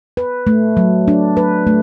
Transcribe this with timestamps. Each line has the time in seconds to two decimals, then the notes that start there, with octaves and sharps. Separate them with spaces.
0.17 B4
0.47 A3
0.77 F#3
1.08 D4
1.37 B4
1.67 A3